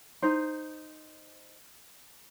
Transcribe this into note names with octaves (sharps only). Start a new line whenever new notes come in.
D#4 C5